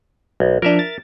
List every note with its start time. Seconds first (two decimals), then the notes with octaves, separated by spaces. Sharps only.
0.40 B1
0.62 F3 D4 A#4 E5
0.79 A6